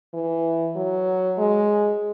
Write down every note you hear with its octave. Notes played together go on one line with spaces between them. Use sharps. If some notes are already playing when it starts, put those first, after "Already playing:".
E3
F#3
G#3